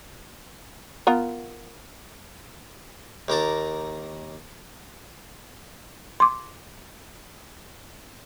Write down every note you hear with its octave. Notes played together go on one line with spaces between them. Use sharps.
B3 F4 A#4
D#2 A#3 A#4 A5
C6 D6